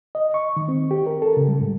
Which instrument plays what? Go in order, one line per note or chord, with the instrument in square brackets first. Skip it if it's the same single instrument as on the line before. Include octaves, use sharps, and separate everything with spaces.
[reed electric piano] D#5
C#6
D#3
C4
G4
A#4
A4
C#3
G3
G#2